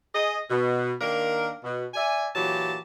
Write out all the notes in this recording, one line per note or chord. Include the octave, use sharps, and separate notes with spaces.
G#4 D#5
B2
D#3 A#3 D4 A#4
B2
D5 E5 G#5
A#2 E3 F#3 G4 A5